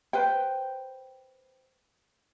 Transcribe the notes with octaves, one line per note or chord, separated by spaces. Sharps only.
B4 C5 G5